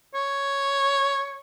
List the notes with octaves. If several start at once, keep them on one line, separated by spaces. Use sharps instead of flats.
C#5